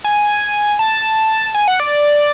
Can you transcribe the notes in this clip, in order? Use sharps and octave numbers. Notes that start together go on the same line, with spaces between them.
G#5
A5
G#5
F#5
D5